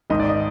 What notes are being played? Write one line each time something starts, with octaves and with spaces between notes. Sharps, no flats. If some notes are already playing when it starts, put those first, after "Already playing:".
G#1 G#2 D#3 D#5
D5
D#5